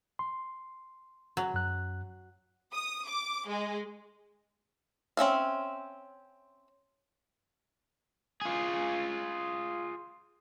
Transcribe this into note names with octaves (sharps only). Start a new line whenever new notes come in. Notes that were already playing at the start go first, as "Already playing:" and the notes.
C6
F#3
F#2 F#6
D#6
D6
G#3
C4 C#4 E5 F5
F4 G#4